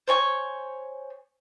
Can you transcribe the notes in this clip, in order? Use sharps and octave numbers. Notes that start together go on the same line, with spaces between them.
C5 C#5 G#5 C#6